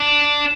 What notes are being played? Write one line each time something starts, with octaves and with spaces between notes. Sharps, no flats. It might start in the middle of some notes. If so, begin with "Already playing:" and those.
Already playing: D4